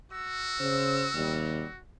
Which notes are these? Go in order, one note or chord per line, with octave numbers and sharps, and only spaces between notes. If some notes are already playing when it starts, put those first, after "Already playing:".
F#4 E6
C#3 C5
D#2 C3 G3